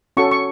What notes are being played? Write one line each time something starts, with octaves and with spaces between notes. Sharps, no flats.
C#4 F#4 A4 C#6
C#6